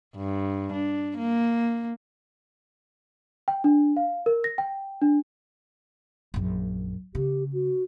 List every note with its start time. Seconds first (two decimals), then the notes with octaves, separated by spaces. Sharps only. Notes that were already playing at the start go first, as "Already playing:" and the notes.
0.16 G2
0.73 D4
1.17 A#3
3.48 G5
3.64 D4
3.97 F5
4.26 A#4
4.44 A#6
4.58 G5
5.02 D4
6.34 A#1 F#2
7.15 C#3 G4
7.53 F#4